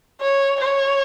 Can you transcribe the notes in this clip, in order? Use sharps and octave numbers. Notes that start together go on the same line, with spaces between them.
C#5
C#5